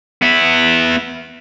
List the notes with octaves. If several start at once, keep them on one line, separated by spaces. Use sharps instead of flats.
B3 E4